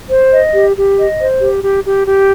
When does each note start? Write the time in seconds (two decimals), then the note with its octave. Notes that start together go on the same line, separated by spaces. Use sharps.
0.11 C5
0.32 D#5
0.54 G4
0.76 G4
0.97 D#5
1.20 C5
1.42 G4
1.63 G4
1.84 G4
2.06 G4